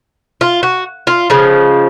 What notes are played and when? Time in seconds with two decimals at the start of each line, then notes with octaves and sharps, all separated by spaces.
0.41 F4
0.63 F#4
1.07 F4
1.30 C#3 F3 G#3